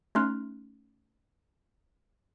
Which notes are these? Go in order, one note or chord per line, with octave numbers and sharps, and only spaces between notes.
A3 C#4 D#4 C6 F6 F#6